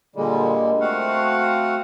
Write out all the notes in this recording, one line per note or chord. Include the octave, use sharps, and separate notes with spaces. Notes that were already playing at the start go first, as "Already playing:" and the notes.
A#2 D3 G3 G#3
A3 C4 F#4 F5 F#5